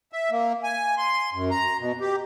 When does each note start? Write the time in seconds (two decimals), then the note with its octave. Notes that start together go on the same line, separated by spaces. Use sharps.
0.12 E5
0.31 A#3
0.63 G#5
0.97 C6
1.33 F#2
1.51 A#5
1.79 B2
2.00 G4